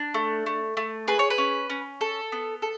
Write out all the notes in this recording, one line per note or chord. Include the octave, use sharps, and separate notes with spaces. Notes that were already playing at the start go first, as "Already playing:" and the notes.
Already playing: D4
A3
A3
A3
G#4 B4
C#5
B4
C#4
C#4
A4
B3
A4